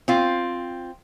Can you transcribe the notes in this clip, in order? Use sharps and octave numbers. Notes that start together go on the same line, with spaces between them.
C4 F4